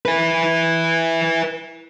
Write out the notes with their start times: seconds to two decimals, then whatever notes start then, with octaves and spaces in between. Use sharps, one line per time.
0.05 E4 B4